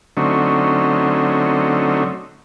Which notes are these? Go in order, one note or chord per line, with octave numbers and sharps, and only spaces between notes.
D3 F#3 A3 C4 C#4 D#4